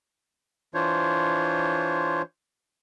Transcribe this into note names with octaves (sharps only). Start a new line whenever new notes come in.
E3 D4 F4 C5 C#5